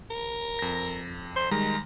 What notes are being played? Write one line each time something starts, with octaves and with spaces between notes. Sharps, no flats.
A#4
F2 A#6
C5
D#3 G3 G#3 A#5